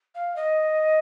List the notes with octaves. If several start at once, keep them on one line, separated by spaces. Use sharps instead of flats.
F5
D#5